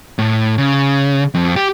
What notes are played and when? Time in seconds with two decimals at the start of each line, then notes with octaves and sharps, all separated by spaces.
0.19 A2
0.58 C#3
1.34 F2
1.56 G4